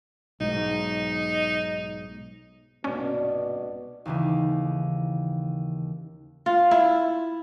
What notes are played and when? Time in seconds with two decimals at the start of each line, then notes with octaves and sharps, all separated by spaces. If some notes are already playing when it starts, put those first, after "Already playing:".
0.40 B1 G#2 D#4
2.84 C2 G#2 B2 A#3 C#4 D4
4.06 D#2 C#3 E3
6.46 F4
6.71 E4